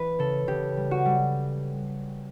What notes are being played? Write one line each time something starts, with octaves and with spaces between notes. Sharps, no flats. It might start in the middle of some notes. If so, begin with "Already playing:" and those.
Already playing: E3 B4
C#3 A4
C#3 G4
G3
F#4
G3